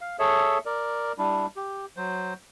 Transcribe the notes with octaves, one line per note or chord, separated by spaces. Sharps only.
F5
G#4 A4 C#5 E5
A#4 D5
G3 D4 E4
G4
F#3 C5